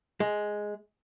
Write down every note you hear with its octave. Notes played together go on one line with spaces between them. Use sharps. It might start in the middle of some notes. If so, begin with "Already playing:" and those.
G#3